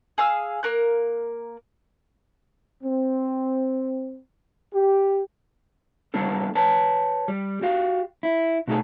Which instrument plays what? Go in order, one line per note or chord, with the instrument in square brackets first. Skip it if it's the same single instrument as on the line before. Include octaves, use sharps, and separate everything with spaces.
[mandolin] G#4 F5 E6
A#3 A#4 F#6
[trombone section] C4
G4
[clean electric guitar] G3 A#3 B3 D4 A4
B4 C#5 A5
G3
F#4 G4 F5
E4
B2 A3 D#4 F4 G#4 A4